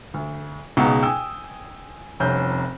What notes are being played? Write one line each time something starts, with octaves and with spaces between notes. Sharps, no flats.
D2
C#2 B2 G#3 D#4 F#5 A#5
G5 G#5 D#6 E6
F1 C2 C#4 G6